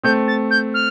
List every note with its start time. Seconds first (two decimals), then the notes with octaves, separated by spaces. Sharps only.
0.03 A3 C4 G6
0.27 A6
0.51 G6
0.74 F6